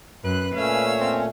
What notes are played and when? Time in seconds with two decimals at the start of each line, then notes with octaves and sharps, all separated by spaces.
0.25 F#2 B4 F#6
0.54 A#2 A3 C#4 F5 E6
1.01 C4